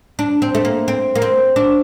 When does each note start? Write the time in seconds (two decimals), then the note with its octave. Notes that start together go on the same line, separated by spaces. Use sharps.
0.19 D4
0.42 C4
0.55 A3
0.65 A#3
0.88 C4
1.15 A#3
1.22 C4
1.56 D4